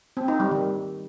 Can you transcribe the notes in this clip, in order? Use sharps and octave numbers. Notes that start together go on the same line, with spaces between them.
C4
D#4
G3
D#3